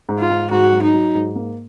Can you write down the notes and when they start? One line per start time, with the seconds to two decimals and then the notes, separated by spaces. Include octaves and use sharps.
0.09 G#2
0.20 F4
0.30 G#2
0.51 G#2 F#4
0.73 F#3
0.83 D#4
0.94 F#3
1.15 G#2
1.36 A#3